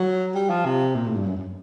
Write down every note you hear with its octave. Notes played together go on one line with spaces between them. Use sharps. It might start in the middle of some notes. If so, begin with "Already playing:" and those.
Already playing: F#3
G3
F3
C3
A#2
A2
G2
F#2
F#2